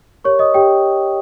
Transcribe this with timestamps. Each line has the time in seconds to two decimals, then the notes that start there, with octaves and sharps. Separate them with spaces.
0.24 G4 A#4 C#5 C#6
0.39 D#5 D#6
0.54 G4 G5